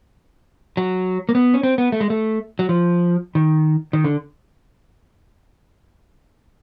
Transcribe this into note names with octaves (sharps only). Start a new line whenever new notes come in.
F#3
A#3
B3
C#4
C4
B3
A3
G#3
A3
F#3
F3
D#3
D#3
D3